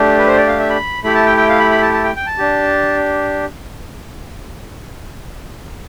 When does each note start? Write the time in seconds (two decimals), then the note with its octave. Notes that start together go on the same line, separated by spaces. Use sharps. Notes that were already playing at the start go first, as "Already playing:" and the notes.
Already playing: A3 D4 G4
0.19 B4
0.27 C5
0.37 D5
0.48 F5
0.59 E5
0.70 B5
1.04 A3 E4 G4 B5
1.15 A5
1.26 G5
1.37 G5
1.49 F5
1.59 B5
1.71 B5
1.82 A5
1.93 A5
2.04 G5
2.16 G5
2.26 A5
2.38 D4 G4